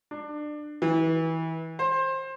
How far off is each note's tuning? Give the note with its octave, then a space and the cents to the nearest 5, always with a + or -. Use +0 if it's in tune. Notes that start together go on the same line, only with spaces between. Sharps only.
D4 +25
E3 -25
C5 +25